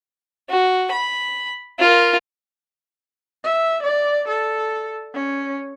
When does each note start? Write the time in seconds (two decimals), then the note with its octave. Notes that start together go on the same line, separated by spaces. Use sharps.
0.49 F#4
0.92 B5
1.79 F4 A#4
3.44 E5
3.83 D5
4.28 A4
5.14 C#4